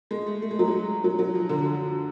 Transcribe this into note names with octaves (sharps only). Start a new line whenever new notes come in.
G#3
A3
A3
G#3
F#3
G#3
F#3
F#3
F3
D3